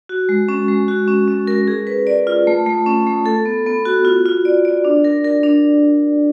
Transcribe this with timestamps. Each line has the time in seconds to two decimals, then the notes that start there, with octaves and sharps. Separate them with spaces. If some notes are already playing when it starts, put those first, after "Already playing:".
0.09 F#4
0.29 G#3
0.49 C#4
0.68 G#3
0.88 F#4
1.08 C#4
1.28 C#4
1.47 A#4
1.68 G#4
1.87 B4
2.07 D5
2.27 F4
2.47 A3
2.66 A3
2.86 C#4
3.07 A3
3.26 A4
3.45 B3
3.66 B3
3.85 F#4
4.05 F4
4.26 F4
4.45 D5
4.65 D5
4.85 D4
5.04 A#4
5.24 A#4
5.43 D4